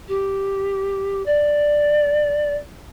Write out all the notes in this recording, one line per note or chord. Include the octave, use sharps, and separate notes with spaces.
G4
D5